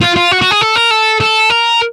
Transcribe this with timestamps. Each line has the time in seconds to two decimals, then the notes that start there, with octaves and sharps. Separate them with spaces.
0.02 F4
0.16 F4
0.31 F#4
0.41 F#4
0.51 G#4
0.61 A4
0.76 A#4
0.91 A4
1.20 A4
1.50 A#4